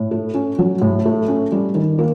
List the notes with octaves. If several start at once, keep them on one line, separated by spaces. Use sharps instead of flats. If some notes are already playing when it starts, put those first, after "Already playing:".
Already playing: A2
A3
C#4
F#3
A2
A3
C#4
G3
D#3
A#3